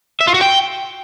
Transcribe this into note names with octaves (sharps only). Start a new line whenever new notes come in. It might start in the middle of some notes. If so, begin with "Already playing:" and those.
E5
F4
F#4
G5